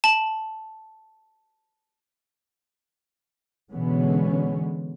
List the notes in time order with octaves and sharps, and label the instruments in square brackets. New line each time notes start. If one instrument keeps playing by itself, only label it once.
[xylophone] A5 F#7
[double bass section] B2 D3 E3 G#3 B3 C#4